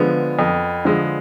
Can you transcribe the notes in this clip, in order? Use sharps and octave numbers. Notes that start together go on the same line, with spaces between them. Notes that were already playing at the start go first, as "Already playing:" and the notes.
Already playing: D3 F3 G#3 B3
F2
D3 F3 G#3